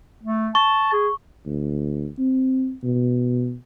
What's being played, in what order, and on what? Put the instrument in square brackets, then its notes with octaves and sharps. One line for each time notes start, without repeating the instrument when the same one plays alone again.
[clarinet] A3
[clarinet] A5 [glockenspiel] C#6
[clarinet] G#4
[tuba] D2
C4
B2